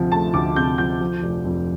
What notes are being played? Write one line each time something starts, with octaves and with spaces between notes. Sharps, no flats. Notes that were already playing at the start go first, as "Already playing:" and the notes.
Already playing: D2 C3 F3
A3 A5
D2 D6
C3 G6
F3 G6
F3
F1
F2